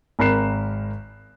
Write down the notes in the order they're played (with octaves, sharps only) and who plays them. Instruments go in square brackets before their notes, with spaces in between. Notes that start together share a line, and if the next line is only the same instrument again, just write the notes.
[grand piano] G#1 A#4 B5 F#6 C7 E7